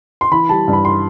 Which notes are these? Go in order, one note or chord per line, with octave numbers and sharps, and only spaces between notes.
C6
E3 B5
G3 A5
G2
B5
C6